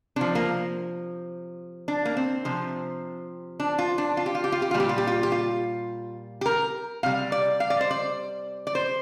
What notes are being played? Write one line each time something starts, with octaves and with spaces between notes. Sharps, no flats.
C3 F3 D4
A#3
D4
A#3
C4
C3 F3
D4
F4
D4
F4
G4
F4
G4
F4
G4
A#2 G3 F4
G4
F4
G4
F4
G4
F4
G4
A#4
C3 G3 F5
D5
F5
D5
C5
D5
D5
C5